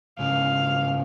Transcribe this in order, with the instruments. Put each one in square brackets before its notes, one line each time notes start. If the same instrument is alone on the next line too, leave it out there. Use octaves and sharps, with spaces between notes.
[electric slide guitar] G#2 C#3 E3 [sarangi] F5